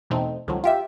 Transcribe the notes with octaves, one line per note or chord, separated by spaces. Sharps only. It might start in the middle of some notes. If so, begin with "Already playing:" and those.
E2 B2 A3 C4 D#4
C#2 A2 D#3 F3 F#3
F4 G4 E5